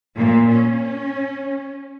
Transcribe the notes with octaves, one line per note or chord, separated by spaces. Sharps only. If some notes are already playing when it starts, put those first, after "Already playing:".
A#2
C#4